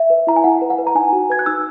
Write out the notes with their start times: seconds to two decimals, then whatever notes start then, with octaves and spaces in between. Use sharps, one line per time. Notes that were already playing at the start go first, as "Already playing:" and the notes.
Already playing: E5
0.10 B4
0.27 E4 A#5
0.36 G#5
0.44 E4 F#5
0.62 B4
0.70 F#5
0.78 B4
0.87 A#5
0.95 D#4 G#5
1.12 F#4
1.30 B4 G#6
1.39 F#6
1.46 D#4 E6